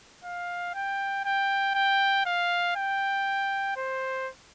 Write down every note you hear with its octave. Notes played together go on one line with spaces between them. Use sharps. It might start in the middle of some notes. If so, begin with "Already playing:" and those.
F5
G5
G5
G5
F5
G5
C5